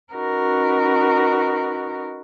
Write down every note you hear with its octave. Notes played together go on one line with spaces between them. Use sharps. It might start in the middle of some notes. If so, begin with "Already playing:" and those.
C#4 D#4 F#4 A#4 B4